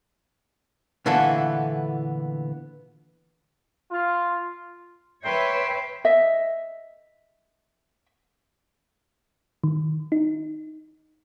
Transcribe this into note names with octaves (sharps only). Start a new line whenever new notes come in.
A#2 D3 E3 A3 B3 A4
F4
B4 C#5 E5 G5 C6
D#5 E5
D#3
D#4